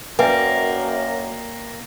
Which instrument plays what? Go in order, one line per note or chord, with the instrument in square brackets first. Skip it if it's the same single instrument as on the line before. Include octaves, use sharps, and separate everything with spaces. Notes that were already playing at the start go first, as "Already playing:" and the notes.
[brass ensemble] F#2 [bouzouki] A#3 [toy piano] B4 E5 G#5 [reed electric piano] D5 G5